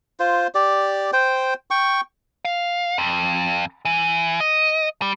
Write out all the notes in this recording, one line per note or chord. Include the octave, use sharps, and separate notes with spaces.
F4 C5
G4 D5
C5 G5
G5 C#6
F5
F2
E3
D#5
G3